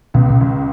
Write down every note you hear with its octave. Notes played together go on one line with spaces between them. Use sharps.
C#2 B2
C#2